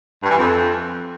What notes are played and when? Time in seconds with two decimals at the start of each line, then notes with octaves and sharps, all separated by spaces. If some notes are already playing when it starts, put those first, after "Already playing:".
0.23 G2
0.30 E3
0.37 F2